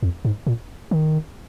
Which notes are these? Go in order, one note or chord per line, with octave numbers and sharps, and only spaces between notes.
F2
G#2
A#2
D#3